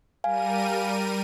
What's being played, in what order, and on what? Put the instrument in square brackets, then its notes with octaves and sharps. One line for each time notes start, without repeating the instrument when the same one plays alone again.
[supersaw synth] G3 A#4 D#7 [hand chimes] F5 G#5